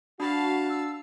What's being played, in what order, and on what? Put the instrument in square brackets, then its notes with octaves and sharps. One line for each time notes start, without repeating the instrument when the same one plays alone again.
[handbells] D4 [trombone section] F#4 [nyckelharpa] F5 A5 [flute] B5
[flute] E6